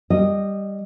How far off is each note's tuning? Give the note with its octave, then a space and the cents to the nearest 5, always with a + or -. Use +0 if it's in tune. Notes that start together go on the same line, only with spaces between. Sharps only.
G3 +5 D#5 -10